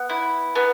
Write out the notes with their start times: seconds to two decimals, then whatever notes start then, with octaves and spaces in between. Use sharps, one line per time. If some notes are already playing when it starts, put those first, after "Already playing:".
Already playing: B3
0.10 E4
0.56 B3